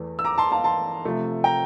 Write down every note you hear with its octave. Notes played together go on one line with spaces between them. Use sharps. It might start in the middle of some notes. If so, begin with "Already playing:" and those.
Already playing: E2 E3 A3
E6
A#5 D6
A5 C6
F5 A5
A5 C6
C3 F3 A3
G5 A#5